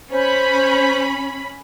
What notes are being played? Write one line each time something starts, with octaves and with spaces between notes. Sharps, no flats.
C#4 C5 B5